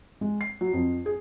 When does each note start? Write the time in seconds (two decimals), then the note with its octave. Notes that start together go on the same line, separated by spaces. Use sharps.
0.21 G#3
0.41 C7
0.61 F#3
0.73 F2
1.06 G#4